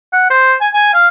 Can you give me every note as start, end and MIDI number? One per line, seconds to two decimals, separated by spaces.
0.13 0.27 78
0.30 0.54 72
0.61 0.68 80
0.73 0.94 80
0.94 1.08 77